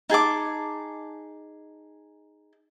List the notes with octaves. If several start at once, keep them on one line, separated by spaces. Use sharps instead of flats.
D#4 G#4 A5 D6